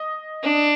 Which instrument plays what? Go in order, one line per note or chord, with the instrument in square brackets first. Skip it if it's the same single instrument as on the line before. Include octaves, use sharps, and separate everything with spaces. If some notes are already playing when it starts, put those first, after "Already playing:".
Already playing: [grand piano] D#5
[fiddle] D4